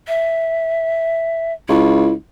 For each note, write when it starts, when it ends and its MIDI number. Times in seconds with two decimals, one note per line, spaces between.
0.08 1.53 76
1.69 2.13 37
1.69 2.13 64